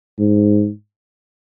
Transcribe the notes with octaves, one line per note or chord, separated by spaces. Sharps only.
G#2